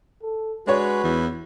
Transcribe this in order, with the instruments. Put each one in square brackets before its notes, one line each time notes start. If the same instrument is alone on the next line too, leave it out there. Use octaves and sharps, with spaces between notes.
[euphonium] A4
[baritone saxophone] G#3 [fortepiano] D4 C#5 [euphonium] F#4 [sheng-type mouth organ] B4
[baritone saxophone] E2